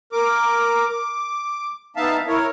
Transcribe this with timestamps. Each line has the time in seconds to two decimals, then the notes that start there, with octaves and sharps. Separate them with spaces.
0.12 A#4 D6
0.90 D6
1.96 B3 D#4 E5 F5 A5
2.27 E4 A#4 C#5